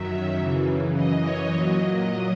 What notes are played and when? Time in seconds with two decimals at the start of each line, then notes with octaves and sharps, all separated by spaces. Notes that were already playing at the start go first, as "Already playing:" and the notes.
Already playing: F#2 D#3 F#3 E5
0.38 F#2 C#3 E3
0.96 F#2 E3 D#5
1.25 C#5
1.54 A#2 F#3 D#5